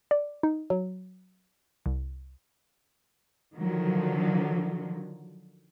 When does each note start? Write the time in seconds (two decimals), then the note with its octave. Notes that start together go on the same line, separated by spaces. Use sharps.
0.11 D5
0.43 D#4
0.70 F#3
1.86 C2
3.57 D3 D#3 F3 F#3